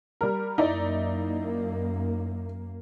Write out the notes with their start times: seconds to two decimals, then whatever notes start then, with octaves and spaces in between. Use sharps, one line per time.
0.21 G3 A#4
0.58 F#2 A#3 D#4 E4 D5